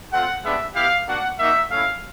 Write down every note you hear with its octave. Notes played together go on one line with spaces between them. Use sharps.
A3 C4 F4 F#5
G#3 B3 D4 G4 E5
B3 E4 G4 F5
A#3 D4 F#4 F#5
A#3 D#4 F#4 E5
A3 C#4 E4 F5